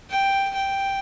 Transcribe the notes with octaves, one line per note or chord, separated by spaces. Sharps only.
G5
G5